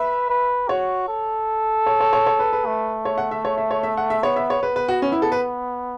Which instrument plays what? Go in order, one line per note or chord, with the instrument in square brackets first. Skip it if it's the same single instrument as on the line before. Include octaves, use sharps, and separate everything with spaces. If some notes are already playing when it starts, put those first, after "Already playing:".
Already playing: [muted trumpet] B4 [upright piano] E5
[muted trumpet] B4
[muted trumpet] F#4 [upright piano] C#5
[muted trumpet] A4
[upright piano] C#5
C#5
C#5
C#5
B4
B4
[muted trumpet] A3
[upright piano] C#5
F#5
E5
C#5
E5
C#5
E5
F#5
E5
[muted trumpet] B3 [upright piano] C#5
[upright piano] E5
C#5
[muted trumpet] B3 [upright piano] B4
[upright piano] B4
F#4
C#4
E4
A4
B4